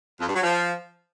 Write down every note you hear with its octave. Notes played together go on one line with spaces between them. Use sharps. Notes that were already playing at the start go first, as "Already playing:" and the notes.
F2
G2
F#3
F3